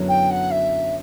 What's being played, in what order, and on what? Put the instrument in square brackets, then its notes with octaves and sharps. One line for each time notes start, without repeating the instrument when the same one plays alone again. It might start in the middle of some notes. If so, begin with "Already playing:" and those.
Already playing: [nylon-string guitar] F#2 D3 F#3 B3 E4
[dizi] G5
F#5
E5